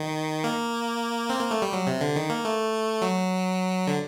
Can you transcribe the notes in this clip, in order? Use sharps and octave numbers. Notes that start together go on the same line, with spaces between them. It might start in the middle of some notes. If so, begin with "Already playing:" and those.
Already playing: D#3
A#3
C4
A#3
A3
G3
F#3
C3
D3
D#3
A#3
A3
F#3
D3